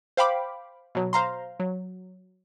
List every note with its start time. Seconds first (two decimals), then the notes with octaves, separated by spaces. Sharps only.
0.17 C5 F5 G5 B5 D6
0.95 B2 F#3
1.13 C5 F5 A#5 C6
1.60 F#3